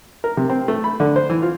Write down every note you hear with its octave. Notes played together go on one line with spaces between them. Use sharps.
A#4
C3
C4
A3
B5
D3
C5
E3
F4